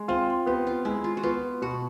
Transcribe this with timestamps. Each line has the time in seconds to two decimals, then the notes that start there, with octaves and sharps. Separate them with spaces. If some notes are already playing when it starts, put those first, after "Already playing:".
Already playing: G#3
0.08 C4 F4
0.46 B3 G4
0.67 F4
0.85 G#3 E4
1.04 F4
1.17 F#4
1.23 B3 F4
1.62 B2 F#4